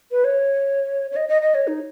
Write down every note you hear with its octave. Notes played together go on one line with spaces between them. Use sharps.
B4
C#5
C#5
D#5
D#5
D#5
C#5
D#4